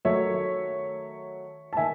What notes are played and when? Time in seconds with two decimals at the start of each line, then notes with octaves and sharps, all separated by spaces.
0.05 D#3 F#3 A3 C#5 E5
1.73 A5
1.77 D#3 E5 G#5